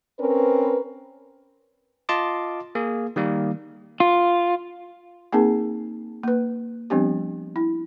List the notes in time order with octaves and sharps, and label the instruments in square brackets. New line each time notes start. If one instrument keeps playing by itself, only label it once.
[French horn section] C4 C#4 A#4 B4
[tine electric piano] F4 D#5 A5 C6 D6
A#3 G#4
D#3 G3 A#3
[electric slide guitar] F4
[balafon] A#3 C4 D#4 G#4 A#4 A5
A#3 B4
F3 G3 B3 C4 D4 G4
E4